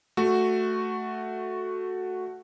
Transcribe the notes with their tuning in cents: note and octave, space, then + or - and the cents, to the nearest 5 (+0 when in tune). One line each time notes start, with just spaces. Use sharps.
A3 +0 F#4 +0